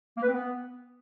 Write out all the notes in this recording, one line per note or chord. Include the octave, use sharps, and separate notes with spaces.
A#3
B4
C4
B3